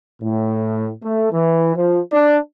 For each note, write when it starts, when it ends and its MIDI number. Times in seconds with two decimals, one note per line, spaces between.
0.22 0.91 45
1.03 1.32 57
1.32 1.72 52
1.76 1.99 53
2.12 2.36 62